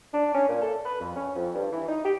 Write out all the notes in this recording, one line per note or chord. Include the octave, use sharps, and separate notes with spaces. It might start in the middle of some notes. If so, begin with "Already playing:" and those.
D4
C#4
A#2
A4
B4
F2
C#4
F2
G2
E3
D#4
G4